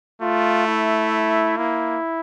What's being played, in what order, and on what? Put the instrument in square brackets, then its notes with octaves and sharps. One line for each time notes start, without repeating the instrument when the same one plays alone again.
[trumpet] A3 [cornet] F4
[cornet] E4
[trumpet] A#3 [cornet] E4